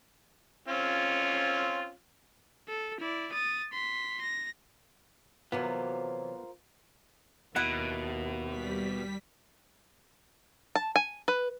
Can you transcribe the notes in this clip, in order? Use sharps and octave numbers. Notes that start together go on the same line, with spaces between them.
C4 C#4 F4
A4
E4 D5
D#6 A6
C6 B6
A#6
C3 E3 F#3 B3 F4 A#4 C5
D#2 B2 E4 F#5
G3 B6
A5
G#5
B4